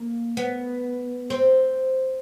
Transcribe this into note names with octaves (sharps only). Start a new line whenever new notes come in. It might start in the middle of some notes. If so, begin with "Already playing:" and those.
Already playing: A#3
B3
C4